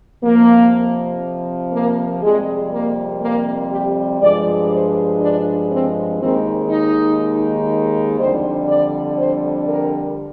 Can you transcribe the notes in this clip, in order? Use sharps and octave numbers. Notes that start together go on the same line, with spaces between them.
F2 C3 F3 A#3
A#3
F2 C3 G3 G#3
A#3
A#3
G4
G2 F3 G#3 D5
C5
D4
C4
D#2 D#3 G#3 C4
D#4
F2 D3 G3 C5
D5
C5
A#4